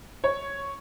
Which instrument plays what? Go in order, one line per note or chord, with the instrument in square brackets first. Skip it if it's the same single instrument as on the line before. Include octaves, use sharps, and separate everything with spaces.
[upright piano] C#5